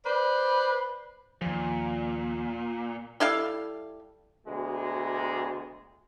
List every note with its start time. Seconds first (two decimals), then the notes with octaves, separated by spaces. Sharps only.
0.05 B4 C5 D5
1.41 D#2 A#2 F3
3.20 G3 E4 A4 F5
4.46 D2 B2 G#3